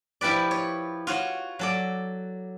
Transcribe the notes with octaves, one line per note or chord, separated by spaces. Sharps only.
F3 E4 G4 B4 D5
C#5
F4 F#4 C#5
F#3 A4 D5